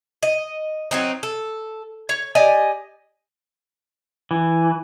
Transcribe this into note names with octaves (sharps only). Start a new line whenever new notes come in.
D#5
F#3 C4 D#4
A4
C#5
G4 D5 D#5 G#5
E3